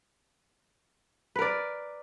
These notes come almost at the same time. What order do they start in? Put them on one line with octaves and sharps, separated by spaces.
B4 A#4 D5